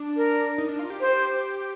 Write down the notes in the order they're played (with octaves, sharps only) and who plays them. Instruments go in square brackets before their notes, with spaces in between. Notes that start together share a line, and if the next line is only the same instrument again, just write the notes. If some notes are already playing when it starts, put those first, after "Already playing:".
Already playing: [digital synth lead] D4
[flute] A#4
[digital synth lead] D#4
D4
F4
G4
[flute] C5